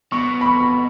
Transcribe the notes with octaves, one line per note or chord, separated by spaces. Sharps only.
B2 C#6
B5
C#6